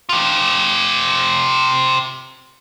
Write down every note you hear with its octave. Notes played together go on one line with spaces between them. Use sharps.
F4 G4